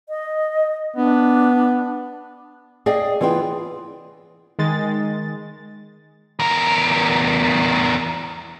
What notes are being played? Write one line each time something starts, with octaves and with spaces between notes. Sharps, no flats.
D#5
B3 D4
G#4 D5 D#5 F5 G5
E3 B3 F4 G#4 G5
D#3 G#3 A6
E2 A#4